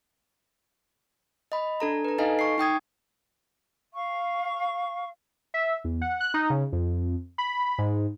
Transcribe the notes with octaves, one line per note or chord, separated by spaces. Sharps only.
D#5 B5
D4 A4 A#5
B4 A#5
D#4 A4 D#5 F5 G#5
C#6 C7
D#4 G5 D#6 G#6
F5 C#6
E5
E2
F#5
F#6
D#4
C#3
F2
B5
G#2